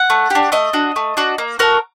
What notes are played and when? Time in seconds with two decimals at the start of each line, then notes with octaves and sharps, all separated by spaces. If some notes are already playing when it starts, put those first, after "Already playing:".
Already playing: F#5
0.10 A3
0.30 D4 G4
0.52 A3 D#5
0.73 D4 F#4
0.96 A3
1.17 D4 F#4
1.38 A#3
1.59 F#4 A4 A#4